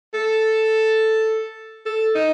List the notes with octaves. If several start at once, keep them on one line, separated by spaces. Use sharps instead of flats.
A4
A4
D#4